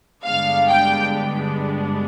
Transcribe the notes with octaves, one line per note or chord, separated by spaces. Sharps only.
G2 D3 G#3 B3 D4 F5
G5